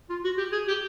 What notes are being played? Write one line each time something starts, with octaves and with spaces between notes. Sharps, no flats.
F4
F#4
G4
G#4
G4